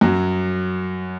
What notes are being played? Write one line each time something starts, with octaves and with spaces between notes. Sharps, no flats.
F#2 F#3